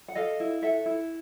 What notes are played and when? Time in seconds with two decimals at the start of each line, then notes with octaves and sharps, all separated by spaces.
0.08 F#5
0.15 A4 D#5 F5
0.40 E4
0.62 A4 E5 F#5
0.86 E4